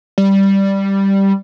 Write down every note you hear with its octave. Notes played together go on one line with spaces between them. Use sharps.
G3